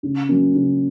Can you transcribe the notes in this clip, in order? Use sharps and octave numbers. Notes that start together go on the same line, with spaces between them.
C#3
F#3 A#3 C#4
C#3